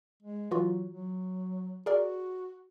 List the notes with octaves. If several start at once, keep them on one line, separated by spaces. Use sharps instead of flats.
G#3
E3 F#3 F4 F#4
F#3
F#4 G#4 A#4 D5